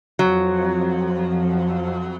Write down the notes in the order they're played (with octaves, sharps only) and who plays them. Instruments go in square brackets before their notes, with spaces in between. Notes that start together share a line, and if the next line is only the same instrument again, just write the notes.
[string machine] F2 F3 [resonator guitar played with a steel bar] F#3